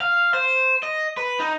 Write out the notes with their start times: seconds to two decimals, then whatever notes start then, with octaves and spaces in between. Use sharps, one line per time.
0.01 F5
0.34 C5
0.83 D#5
1.17 B4
1.40 D#4